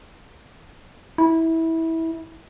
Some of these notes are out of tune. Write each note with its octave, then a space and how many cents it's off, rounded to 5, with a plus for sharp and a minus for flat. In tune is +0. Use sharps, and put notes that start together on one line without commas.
E4 -20